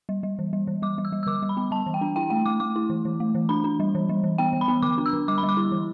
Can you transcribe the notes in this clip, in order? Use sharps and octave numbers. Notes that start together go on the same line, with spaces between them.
G3
G3
E3
G3
E3
G3 D6
G3
E6
G3
E6
D3 D6
G3
B5
B3
G3 A5
E3
G5
D4
E4 G5
A3 G5
A3 D6
A3 D6
E4
E3
E3
A3
E3
D4 B5
D4
G3
E3
G3
E3
B3 G5
E3
B5
B3
D3 D6
D4
E6
D3
G3 D6
B5
G3
D6
E4
E3